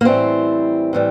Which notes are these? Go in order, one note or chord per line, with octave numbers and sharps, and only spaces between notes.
A#3
A2 E3 G3 C4
A2 E3 G3